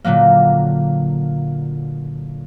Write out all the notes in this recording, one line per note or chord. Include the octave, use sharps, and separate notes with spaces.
A#2 D3 F#3 A#3